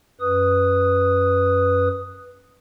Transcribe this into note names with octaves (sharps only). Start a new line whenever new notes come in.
F#2 B4 D#6